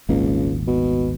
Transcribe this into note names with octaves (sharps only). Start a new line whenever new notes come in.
D#1 G#1 C#2 A#3
B2